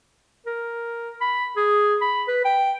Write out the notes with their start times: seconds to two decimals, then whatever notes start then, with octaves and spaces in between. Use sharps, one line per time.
0.46 A#4
1.21 B5
1.56 G#4
2.01 B5
2.28 B4
2.45 G5